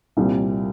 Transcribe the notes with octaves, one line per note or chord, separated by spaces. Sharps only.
C2 A#2 G3